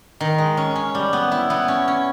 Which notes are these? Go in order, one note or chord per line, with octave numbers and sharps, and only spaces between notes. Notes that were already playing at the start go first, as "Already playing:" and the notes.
D#3
G#3
C#4
C#4
G3
B3
E4
B3
C#4
C#4